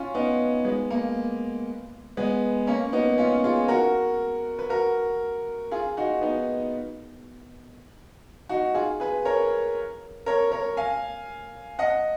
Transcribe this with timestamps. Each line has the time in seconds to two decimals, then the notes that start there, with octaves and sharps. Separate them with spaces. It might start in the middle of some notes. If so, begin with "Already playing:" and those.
Already playing: C#4 F4
0.14 B3 D#4
0.65 G#3 B3
0.90 A#3
2.17 G#3 B3
2.67 A#3 C#4
2.93 B3 D#4
3.18 C#4 F4
3.44 F4 G#4
3.68 F#4 A#4
4.59 B4
4.70 F#4 A#4
5.71 F4 G#4
5.97 D#4 F#4
6.21 B3 D#4
8.49 D#4 F#4
8.75 F4 G#4
9.00 G#4 B4
9.25 A#4 C#5
10.26 A#4 C#5
10.52 A#4 C#5
10.77 F5 G#5
11.79 D#5 F#5